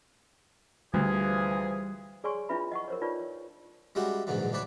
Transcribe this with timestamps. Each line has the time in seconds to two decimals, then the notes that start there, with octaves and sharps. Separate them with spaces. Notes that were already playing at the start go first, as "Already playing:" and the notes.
0.94 D2 E3 F3 G3 G#4
2.24 G#4 C#5 D5 G#5 C6 C#6
2.49 D4 E4 F4 B4 E5 B5
2.72 D#5 F#5 C#6
2.88 A#4 C5 C#5
3.01 D4 D#4 F4 B4 C#5 D5
3.19 C#5
3.95 G3 G#3 C#4 E4 F#4 G4
4.27 A#1 G#2 B2 D3 E3 F#3
4.53 D2 E3 D4 B4 C#5